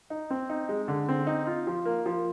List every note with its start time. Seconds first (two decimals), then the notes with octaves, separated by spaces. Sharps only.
0.10 D#4
0.30 C4
0.50 D#4
0.69 G#3
0.88 D3
1.08 C4
1.27 D#4
1.47 F4
1.67 F3
1.85 A#3
2.06 F3